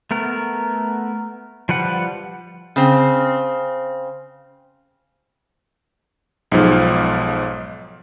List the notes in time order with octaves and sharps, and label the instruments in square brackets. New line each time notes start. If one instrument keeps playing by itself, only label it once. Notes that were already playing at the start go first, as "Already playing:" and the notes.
[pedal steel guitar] A3 B3 A#4
F3 G3 B4 F#5
[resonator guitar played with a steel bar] C#3 C4
[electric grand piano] B1 G#2 F3